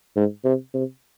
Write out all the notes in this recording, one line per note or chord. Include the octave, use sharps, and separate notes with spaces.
G#2
C3
C3